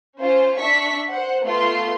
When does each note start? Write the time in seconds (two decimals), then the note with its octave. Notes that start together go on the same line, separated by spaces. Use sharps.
0.19 C#4 F4 C5
0.58 D4 E5 C#6 B6
1.09 C5 F#5
1.44 A3 B3 F4 C6